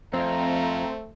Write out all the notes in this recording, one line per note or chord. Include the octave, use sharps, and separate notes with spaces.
F2 A3 C4 D#5 F5 A#5